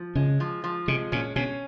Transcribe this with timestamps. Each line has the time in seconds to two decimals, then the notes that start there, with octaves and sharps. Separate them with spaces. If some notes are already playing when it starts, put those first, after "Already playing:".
Already playing: F3
0.15 C#3 G#3
0.40 F3
0.64 F3
0.88 C3 G#3
1.12 A#2 C#4
1.36 B2 C#4